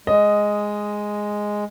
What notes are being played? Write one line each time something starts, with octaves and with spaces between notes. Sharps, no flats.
G#3 D#5